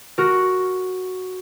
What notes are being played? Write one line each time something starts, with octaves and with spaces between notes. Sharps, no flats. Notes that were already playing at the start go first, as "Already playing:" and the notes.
F#4 A#4